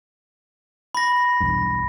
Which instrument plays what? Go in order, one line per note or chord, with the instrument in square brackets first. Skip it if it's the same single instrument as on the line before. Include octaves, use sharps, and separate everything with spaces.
[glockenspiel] B5 A#6
[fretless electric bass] B1 E2 G2